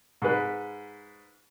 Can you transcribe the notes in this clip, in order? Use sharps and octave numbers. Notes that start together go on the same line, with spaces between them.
G#2 B4